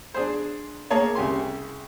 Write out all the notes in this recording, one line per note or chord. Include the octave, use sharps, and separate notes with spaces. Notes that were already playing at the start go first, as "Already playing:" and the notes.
D4 G#4 C5
A#3 G#4 C#5 A5
C2 C#3 G4 G#5 C6